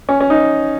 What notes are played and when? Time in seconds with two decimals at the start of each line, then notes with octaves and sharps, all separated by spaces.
0.09 C#4
0.20 C#4
0.30 D#4